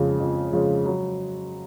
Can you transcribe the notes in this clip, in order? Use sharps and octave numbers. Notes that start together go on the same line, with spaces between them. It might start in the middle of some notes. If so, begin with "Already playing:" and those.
Already playing: F2 C#3 F3 G#3
F2
C#3 F3 G#3
F#3